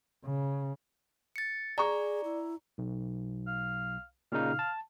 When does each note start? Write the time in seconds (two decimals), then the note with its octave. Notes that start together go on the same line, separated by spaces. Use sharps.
0.24 C#3
1.36 A6 C#7
1.78 G#4 D5 A#5 C#6
2.24 E4
2.78 B1
3.47 F5
4.32 A#2 C#3 D#4 F5
4.59 A5